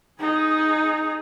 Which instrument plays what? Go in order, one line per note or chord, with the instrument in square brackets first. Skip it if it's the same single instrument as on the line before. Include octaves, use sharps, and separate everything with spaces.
[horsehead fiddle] D#4 G#4